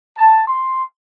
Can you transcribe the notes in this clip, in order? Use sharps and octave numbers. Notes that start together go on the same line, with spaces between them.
A5
C6